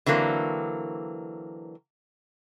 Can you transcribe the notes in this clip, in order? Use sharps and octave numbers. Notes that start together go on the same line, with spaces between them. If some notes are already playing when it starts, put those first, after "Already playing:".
D3 E3 F#3 A#3 C4